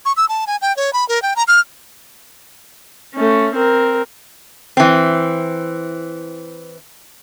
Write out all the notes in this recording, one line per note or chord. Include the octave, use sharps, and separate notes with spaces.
C#6
E6
A5
G#5
G5
C#5
B5
A#4
G5
A#5
F6
A3 C#4
C4 A#4
E3 C4